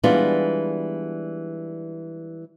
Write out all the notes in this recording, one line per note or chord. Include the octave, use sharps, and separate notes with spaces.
E3 G3 G#3 B3 D4 F4